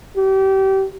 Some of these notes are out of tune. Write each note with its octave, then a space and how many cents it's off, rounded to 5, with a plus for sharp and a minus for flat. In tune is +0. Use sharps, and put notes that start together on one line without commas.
G4 -30